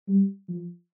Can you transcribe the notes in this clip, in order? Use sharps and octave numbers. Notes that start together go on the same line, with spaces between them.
G3
F3